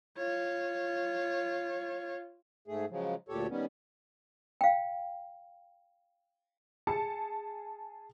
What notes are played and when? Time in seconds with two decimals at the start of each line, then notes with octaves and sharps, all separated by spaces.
0.17 F4 C#5
2.68 G#2 A3 G#4
2.90 C#3 F3 F#3 G#3
3.29 D2 A#2 G4 A4 C#5
3.49 D#3 G3 B3 C#4
4.61 F5 G5
6.87 G#4 A5 C#7